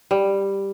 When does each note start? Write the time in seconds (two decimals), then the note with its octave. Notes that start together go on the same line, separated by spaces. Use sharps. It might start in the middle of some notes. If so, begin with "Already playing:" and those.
0.11 G3